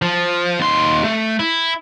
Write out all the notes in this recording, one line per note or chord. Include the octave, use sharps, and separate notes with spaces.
F3
D#2 C6
A3
E4